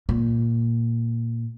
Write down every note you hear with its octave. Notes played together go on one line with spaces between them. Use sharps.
A#2